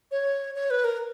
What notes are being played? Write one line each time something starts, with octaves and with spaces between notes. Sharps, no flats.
C#5
C#5
B4
A#4